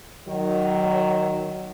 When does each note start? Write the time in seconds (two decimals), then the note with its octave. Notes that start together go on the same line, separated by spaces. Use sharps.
0.27 D#3 F#3